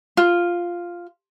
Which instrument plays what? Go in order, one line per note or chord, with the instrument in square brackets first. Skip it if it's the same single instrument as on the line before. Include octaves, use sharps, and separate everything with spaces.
[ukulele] F4